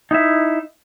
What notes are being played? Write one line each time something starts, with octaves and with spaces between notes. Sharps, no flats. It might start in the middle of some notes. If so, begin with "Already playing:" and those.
D#4 E4 E5